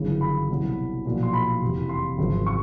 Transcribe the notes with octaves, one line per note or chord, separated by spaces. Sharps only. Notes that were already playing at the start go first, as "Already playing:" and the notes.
Already playing: G1 F#2 C#3 E3
B5
C2 B2 F#3
B1 A#2 F3
C6
B5
F1 E2 C3 E3
C6
G#1 F#2 C#3 F3
C#6